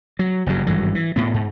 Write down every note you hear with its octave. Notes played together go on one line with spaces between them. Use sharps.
F#3
F#1 G2 F#3
G#1 G2 E3 F#3
E3
A2 B3
G#2